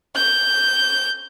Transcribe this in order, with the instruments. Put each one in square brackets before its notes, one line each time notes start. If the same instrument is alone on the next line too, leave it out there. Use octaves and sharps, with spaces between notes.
[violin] G6